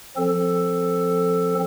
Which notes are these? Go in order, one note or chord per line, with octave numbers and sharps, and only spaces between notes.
F3 C4 A4